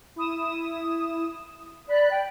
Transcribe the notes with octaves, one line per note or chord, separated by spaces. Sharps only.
E4 D#6 E7
D5 B5 F#6
G5